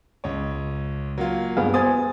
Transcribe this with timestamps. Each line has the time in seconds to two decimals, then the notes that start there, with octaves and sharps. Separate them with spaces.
0.24 C#2 C#5
1.18 F#3 A#3 F4
1.57 G2 B3 G#4 F5
1.74 B3 C5 G#5 D#6 A6